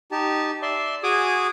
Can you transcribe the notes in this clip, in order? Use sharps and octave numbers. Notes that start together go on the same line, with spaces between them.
D#4 G4 A5
D5 E5 C6
F#4 G#4 G#5 D6 D#6